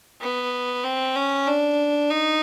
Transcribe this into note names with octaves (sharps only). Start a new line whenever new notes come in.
B3
C4
C#4
D4
D#4